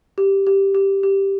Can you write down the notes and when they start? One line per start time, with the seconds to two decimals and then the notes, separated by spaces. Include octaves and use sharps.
0.18 G4
0.47 G4
0.75 G4
1.03 G4